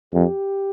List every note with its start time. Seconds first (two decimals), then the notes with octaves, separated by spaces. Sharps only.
0.13 F2 G4